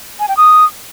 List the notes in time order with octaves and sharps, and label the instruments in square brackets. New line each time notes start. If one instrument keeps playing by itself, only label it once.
[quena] G#5
G5
D#6